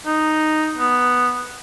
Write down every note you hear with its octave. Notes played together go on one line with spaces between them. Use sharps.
D#4
B3